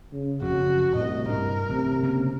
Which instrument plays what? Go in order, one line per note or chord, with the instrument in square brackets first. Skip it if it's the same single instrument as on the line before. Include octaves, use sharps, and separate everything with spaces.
[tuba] C#3
[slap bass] F#1 F2 F#3 [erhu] F#4
[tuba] C2 [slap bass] A2 [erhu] D#5
[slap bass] G2 D4 [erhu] A#4
[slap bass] A1 [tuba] C3
[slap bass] C#3 A#3 C#4